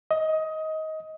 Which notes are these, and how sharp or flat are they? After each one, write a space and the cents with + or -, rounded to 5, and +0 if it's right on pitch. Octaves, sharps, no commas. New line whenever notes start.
D#5 +20